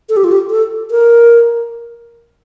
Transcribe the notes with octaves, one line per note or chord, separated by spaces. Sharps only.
A4
G4
F4
G4
A4
A#4